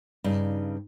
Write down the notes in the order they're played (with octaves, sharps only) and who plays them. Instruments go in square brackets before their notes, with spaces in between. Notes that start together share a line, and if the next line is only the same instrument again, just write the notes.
[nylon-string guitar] G2 C#3 D#4